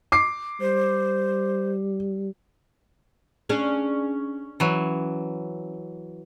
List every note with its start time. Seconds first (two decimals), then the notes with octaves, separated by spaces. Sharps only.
0.12 D6 C7
0.61 G3 C5
3.49 C#4 D4 G#4
4.60 E3 F#3